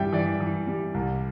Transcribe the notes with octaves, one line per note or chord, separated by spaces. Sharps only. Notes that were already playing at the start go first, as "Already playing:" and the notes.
Already playing: G2 E3 G3 E5 G5
E3 D5
E3
G3
C2